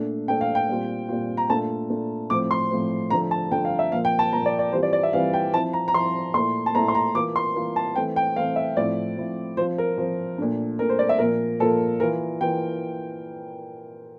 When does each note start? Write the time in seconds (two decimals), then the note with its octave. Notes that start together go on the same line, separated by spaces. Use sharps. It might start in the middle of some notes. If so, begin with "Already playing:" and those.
Already playing: A#2 A3 D4
0.28 A#2 A3 D4 G5
0.41 F5
0.55 G5
0.69 A#2 G3 C4 F4
1.09 A#2 G3 C4 F4
1.37 A#5
1.49 A#2 A3 D4 F4 A5
1.90 A#2 A3 D4 F4
2.30 A2 F3 C4 D6
2.51 C6
2.71 A2 F3 C4
3.10 D3 F3 A3 A#5
3.31 A5
3.51 D3 F3 A3 G5
3.65 F5
3.79 E5
3.92 A#2 F3 A#3 F5
4.05 G5
4.19 A5
4.32 A#2 F3 A#3 A#5
4.46 D5
4.59 D5
4.73 E3 G3 C4 F4 C5
4.83 D5
4.93 D5
5.03 E5
5.13 E3 G3 C4 F4 F5
5.33 G5
5.53 F3 C4 E4 A5
5.73 A#5
5.88 A#5
5.94 F3 C4 E4 C6
6.34 A#2 A3 E4 C6
6.66 A5
6.74 A#2 A3 E4 A#5
6.88 C6
6.95 A#5
7.14 E3 A#3 F4 D6
7.36 C6
7.56 E3 A#3 F4
7.76 A5
7.96 E3 A3 C4 G5
8.16 G5
8.36 E3 A3 C4 F5
8.56 E5
8.77 A2 F3 C4 E4 D5
9.17 A2 F3 C4 E4
9.57 F3 C4 F4 C5
9.78 A#4
9.98 F3 C4 F4
10.38 A#2 A3 D4
10.79 A#2 A3 D4 A#4
10.89 C5
10.99 D5
11.09 E5
11.19 A#2 F3 A#3 F4 A#4
11.60 A#2 F3 A#3 F4 A4
12.00 E3 A#3 F4 A#4
12.41 E3 A#3 F4 G5